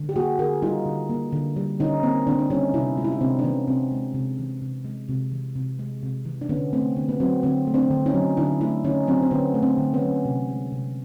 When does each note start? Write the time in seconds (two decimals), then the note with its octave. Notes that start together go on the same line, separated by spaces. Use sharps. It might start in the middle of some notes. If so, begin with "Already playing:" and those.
Already playing: D3
0.09 G4
0.16 A#3 F#4 G#4
0.39 D3 G#4 A#4
0.62 G3 D#4 F4
0.86 D3
1.10 A#3
1.32 D3
1.56 G3
1.80 D3 C#4 D#4
2.03 A#3 C4
2.27 D3 C4 D4
2.39 D4
2.50 G3 C#4 D#4
2.74 C3 D4 E4
2.97 G#3 F4
3.04 E4
3.13 D#4
3.21 C3 C4 D4
3.39 D4
3.44 E3 B3 C#4
3.68 C3 C4
3.91 G#3
4.15 C3
4.38 E3
4.61 C3
4.85 G#3
5.09 C3
5.32 E3
5.56 C3
5.79 G#3
6.03 C3
6.25 E3
6.41 D4
6.49 D3 B3 C#4
6.73 A3 C4
6.96 D3 B3
7.09 B3
7.20 F#3 C4
7.43 D3 C4
7.67 A3
7.74 C4 D4
7.91 D3
8.06 C#4 D#4
8.14 F#3
8.37 D3 D4 E4
8.61 A3 D4 E4
8.84 D3 C#4 D#4
9.07 F#3 C4 D4
9.23 C4
9.31 D3 B3 C#4
9.54 A3
9.63 C4 D4
9.78 D3
9.94 B3 C#4
10.01 F#3
10.25 C3
10.49 G#3
10.72 C3